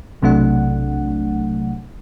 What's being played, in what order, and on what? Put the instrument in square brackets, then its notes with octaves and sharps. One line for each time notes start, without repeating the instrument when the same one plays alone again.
[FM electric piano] B1 C3 F#3 A3 D4 F#5